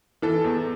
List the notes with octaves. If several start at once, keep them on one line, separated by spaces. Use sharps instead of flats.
E3 A4
E2